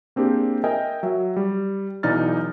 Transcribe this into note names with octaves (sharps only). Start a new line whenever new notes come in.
A#3 C4 D4 G4 G#4
A#4 D#5 E5 G5 G#5
F#3 E5
G3
B1 E3 D#4 D5 F6 A6